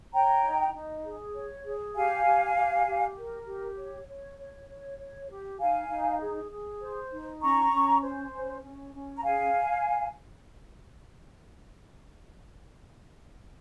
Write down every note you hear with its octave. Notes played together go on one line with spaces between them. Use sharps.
C#5 G5 A#5
D#4
D#4
G#4
C#5
G#4
G4 F5 G#5
G4
G4
G4
A#4
G4
C#5
C#5
C#5
C#5
C#5
G4
D#4 F5 G#5
D#4
G#4
G#4
C5
D#4
C#4 A#5 C#6
C#4
C5
C#4
C#4
C#4
A#5
G#4 F5 G#5